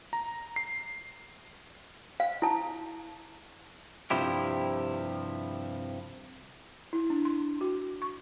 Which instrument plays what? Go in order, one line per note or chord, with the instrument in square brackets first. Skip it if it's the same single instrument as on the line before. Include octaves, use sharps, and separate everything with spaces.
[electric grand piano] A#5
C7
[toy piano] F5
E4 A5
[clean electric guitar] G2 C3 F3 E4 G4
[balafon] E4
D4
C6
F#4
C#6